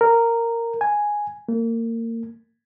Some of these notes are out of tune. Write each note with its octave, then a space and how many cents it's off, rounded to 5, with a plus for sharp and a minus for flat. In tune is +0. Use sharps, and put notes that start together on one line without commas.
A#4 -10
G#5 +0
A#3 -30